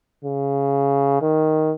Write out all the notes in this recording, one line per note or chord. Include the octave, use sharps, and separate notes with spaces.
C#3
D#3